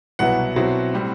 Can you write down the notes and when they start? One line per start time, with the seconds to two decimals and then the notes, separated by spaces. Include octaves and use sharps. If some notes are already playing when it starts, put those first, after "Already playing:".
0.19 C2 B2 F#3 B3 E4 F#5
0.56 B2 F#3 C4 E4
0.93 A2 G3 C4